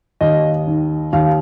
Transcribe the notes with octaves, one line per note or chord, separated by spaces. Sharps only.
D#2 D#5
D#3
D#2 F5